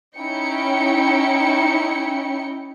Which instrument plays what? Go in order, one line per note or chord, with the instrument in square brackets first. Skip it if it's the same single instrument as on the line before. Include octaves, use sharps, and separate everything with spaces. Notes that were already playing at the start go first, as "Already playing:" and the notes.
[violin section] C#4 D#4 E4 G5 C#7